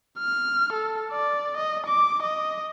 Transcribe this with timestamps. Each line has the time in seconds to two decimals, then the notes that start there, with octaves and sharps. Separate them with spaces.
0.19 F6
0.73 A4
1.12 D5
1.57 D#5
1.87 D6
2.23 D#5